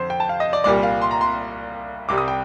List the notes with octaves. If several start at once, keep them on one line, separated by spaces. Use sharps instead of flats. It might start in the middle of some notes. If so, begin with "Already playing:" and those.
Already playing: F2 D3 C5
G5
A5
F5
D#5
D5
C2 A#2 G3 D5
F5
C6
A#5
C6
C2 C3 G3 D6
D#6
G5